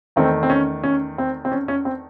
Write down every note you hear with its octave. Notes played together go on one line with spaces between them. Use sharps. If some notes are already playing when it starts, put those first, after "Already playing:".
E2 D#3 A3 C4
C4
C#4
C#4
C4
C4
C#4
C#4
C4